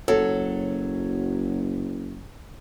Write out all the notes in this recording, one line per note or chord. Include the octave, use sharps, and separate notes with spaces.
F#1 F#3 A4